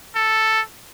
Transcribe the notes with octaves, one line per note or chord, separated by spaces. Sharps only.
A4